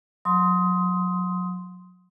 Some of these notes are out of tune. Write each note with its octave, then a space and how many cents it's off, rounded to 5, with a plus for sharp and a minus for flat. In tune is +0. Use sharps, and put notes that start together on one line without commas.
F#3 -35 C6 +0 D#6 +20